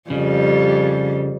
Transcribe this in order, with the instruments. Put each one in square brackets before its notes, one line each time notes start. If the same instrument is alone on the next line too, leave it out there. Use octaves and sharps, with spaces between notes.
[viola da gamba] F2 G3 [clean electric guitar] C#3